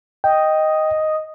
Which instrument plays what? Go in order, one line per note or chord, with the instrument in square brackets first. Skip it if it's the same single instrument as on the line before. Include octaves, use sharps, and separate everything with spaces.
[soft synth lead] D#5 [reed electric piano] G5